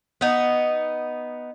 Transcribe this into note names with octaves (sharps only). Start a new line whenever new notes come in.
B3 D#4